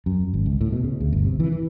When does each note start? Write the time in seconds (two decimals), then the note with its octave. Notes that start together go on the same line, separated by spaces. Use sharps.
0.06 F#2
0.34 G#1
0.46 C#2
0.61 A2
0.72 B2
0.84 C#3
1.00 D2
1.13 G1
1.25 C3
1.40 E3
1.52 E3